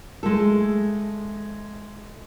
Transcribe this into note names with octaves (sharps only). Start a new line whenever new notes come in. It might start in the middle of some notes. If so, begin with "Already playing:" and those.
G#3 A3 A4